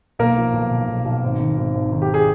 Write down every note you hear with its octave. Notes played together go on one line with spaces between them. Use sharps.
B1 A#3 A#4
F3
B1
B1
B1
B1
G#1
D#3
G#1
G#1
D#3
G4
G#4